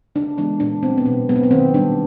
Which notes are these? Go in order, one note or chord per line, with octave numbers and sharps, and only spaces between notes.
C#3 D4
E3 G#3 B3 D4
A#2 D4
F#3 B3 C4
B3
B2 C4
F#3 B3
C4
B3
D#3 C4
G3 B3 D4